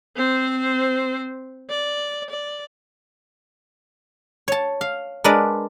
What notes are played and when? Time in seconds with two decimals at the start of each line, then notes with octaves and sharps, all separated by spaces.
0.16 C4 C5
1.70 D5
2.30 D5
4.48 C#5 A5
4.81 F5
5.24 G#3 D4 A#4 B4 D5